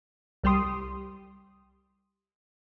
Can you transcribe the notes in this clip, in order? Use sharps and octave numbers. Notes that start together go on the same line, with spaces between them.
C2 G3 G4 C6 D#6